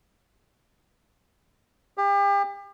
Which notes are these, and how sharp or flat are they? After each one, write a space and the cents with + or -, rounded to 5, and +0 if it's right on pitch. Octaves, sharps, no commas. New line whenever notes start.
G4 +35